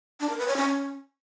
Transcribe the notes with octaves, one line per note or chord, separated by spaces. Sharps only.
D4
A#4
B4
C#5
C#4